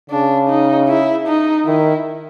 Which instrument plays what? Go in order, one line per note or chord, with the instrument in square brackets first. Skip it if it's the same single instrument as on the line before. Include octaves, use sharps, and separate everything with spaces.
[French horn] C#3 [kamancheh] D4
[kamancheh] D#4
E4
D#4
[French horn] D#3 [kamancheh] E4